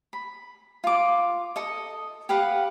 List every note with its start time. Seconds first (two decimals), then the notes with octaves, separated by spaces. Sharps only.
0.13 B5
0.84 F4 D6
1.56 A4 D#5
2.29 G4 B4 F5 F#5